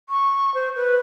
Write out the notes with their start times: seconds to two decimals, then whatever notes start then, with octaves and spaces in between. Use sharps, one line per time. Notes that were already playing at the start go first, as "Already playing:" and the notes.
0.09 C#6
0.54 C5
0.76 B4